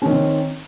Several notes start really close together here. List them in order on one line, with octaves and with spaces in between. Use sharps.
C#4 D#3 C4